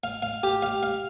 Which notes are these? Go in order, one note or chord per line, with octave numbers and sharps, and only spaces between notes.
F5
F5
G4
F5
F5